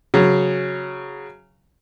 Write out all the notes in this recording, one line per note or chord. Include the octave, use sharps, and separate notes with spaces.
C#3 F#3